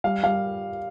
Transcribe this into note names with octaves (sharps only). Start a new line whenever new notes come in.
G3 F5
G3 F5